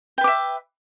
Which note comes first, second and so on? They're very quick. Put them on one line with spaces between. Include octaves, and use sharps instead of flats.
G5 B4 D6 E5